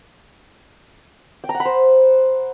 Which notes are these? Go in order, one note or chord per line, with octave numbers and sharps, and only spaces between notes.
G5
A#5
F#5
B5
C5